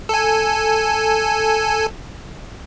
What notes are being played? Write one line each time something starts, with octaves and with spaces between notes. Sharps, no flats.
A4 G#5